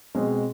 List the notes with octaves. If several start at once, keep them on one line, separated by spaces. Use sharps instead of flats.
B2 G#3 C4